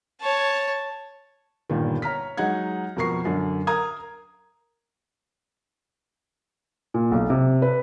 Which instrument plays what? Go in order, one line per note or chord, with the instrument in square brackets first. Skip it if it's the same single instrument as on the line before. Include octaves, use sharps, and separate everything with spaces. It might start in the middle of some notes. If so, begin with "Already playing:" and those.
[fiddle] C#5 A5
[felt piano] G1 G2 A#2 D#3
C#5 A#5 F6 B6
F#3 G#3 D#4 F#5 G#6
F2 B2 A#4 C#6 C7
F#2 D3
A#4 A#5 D#6 G#6
A#2
B1
C3
B4